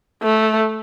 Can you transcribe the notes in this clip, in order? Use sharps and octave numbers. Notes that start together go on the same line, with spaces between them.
A3